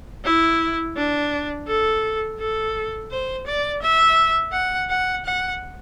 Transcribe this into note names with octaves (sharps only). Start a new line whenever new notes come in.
E4
D4
A4
A4
C5
D5
E5
F#5
F#5
F#5